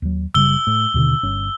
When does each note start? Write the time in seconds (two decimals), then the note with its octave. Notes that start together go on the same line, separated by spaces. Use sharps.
0.02 D#2 F#3
0.34 F#1 C#3 G3 E6 G7
0.67 A2
0.94 D#2 B2 D3
1.23 G1 C#4